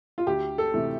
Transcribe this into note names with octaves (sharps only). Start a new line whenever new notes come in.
F4
D2 G4
A4
C3 E3 A3